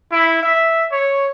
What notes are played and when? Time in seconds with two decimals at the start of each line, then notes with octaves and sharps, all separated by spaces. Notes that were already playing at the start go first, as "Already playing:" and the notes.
0.12 E4
0.43 E5
0.92 C#5